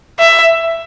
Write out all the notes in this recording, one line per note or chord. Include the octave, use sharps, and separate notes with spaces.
E5